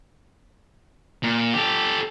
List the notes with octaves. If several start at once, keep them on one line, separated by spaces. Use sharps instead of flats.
A#2
G4 A4